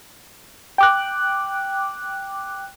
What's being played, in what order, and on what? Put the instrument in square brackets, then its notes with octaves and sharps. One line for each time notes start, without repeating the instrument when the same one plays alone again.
[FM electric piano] G5 D6 F#6